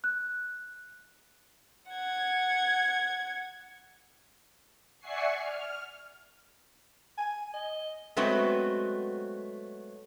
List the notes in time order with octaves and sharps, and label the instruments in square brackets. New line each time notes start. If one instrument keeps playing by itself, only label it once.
[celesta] F#6
[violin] F#5 G#6
[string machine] D5 E5 F#5 G#5 C#6 C7
F6
[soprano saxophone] G#5
D#5
[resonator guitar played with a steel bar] F#3 G#3 A3 B3 C4 F#4